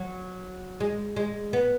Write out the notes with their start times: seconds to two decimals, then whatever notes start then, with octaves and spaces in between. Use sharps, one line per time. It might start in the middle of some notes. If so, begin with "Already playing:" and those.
Already playing: F#3
0.80 G#3
1.16 G#3
1.53 B3